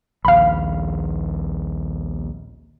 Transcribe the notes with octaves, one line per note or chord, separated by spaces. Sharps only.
A#1 D#2 F5 B5